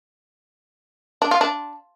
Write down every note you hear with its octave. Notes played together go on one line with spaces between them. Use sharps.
D4
F4
D4